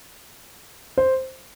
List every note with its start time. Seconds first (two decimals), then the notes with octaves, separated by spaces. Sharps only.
0.98 C5